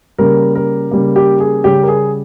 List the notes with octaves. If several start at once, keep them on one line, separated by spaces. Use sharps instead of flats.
C#3 G3 A#3 A#4
A#4
C#3 G3 A#3
G4
G#4
C#3 G3 C#4 G4
A#4
G#4